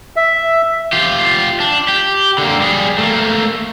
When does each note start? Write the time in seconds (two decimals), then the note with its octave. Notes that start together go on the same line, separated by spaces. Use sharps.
0.16 E5
0.93 F4 G4
1.60 D4
1.88 G4
2.38 D3 A#3
2.60 G3 G#4
2.98 A3 A#3